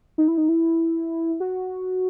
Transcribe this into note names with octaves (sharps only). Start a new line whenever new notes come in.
D#4
E4
D#4
E4
F#4